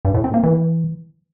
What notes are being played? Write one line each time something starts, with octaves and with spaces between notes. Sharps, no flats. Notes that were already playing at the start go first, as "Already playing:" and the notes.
G2
A2
C4
A#3
E3